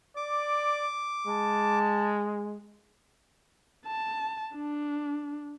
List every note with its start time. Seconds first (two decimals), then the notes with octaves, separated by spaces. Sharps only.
0.17 D5 D6
1.27 G#3 A5
3.86 A5
4.55 D4